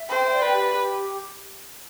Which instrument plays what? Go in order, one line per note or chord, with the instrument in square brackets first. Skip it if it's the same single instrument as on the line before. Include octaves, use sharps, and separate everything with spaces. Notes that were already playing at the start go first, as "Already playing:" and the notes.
Already playing: [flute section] E5
[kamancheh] C5 [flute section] G5
[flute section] D5
[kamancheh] B4
[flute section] G4
G4